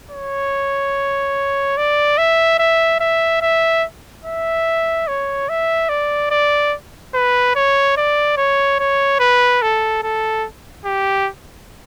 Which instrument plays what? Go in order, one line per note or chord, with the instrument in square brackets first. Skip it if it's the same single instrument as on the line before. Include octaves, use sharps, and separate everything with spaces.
[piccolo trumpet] C#5
D5
E5
E5
E5
E5
E5
C#5
E5
D5
D5
B4
C#5
D5
C#5
C#5
B4
A4
A4
G4